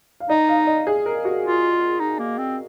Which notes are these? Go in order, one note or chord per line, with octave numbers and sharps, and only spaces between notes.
F5
D#4 D#5
F5
D#5
G#4
A#4
F#4
F4
D#4
A#3
C4